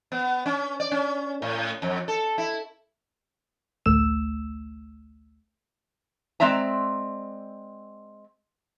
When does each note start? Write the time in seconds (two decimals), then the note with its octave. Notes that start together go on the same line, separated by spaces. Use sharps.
0.12 B3
0.46 C#4
0.80 D5
0.91 C#4
1.42 A2
1.82 F2
2.08 A4
2.38 E4
3.86 A1 D2 A3 E6 E7
6.40 G#3 C4 D5 E5 A#5